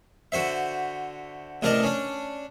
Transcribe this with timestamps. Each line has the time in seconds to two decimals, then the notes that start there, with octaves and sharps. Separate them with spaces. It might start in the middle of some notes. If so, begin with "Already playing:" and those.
0.32 D3 F#4 C5 E5
1.62 A1 C3 D4 A#4 D5 D#5
1.83 C#4 D4